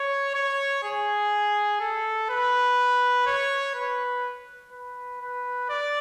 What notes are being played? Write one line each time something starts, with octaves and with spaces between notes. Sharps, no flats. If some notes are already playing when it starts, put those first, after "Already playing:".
Already playing: C#5
C#5
G#4
A4
B4
C#5
B4
B4
B4
D5